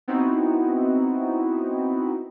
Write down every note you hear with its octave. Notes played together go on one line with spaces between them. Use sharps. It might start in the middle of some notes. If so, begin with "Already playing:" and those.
B3 C4 D#4 E4 F#4